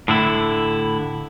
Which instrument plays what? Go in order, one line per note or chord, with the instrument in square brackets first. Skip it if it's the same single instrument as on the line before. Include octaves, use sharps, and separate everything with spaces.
[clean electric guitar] A2 D3 E4